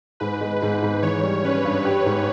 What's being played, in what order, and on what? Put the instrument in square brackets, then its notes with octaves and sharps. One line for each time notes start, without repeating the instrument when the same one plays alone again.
[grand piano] G#2 [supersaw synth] B4
[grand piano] G#3
[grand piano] G#2 [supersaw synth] B4
[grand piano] G#2
[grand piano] E3 [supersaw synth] C#5
[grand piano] G3
[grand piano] C#4 [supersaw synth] B4
[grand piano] G2
G4
G#2